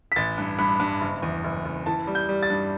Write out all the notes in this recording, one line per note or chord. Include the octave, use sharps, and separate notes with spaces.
B6
A1 A6
G2
G2 B5
G2
F#1
E2
F#1
F#1
E3 A5
G3
G6
G3
A6
G2